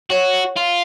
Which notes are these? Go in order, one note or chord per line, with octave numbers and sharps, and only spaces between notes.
F#4 C#5
F4